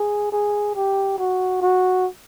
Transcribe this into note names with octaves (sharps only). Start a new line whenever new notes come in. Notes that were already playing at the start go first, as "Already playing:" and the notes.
Already playing: G#4
G#4
G4
F#4
F#4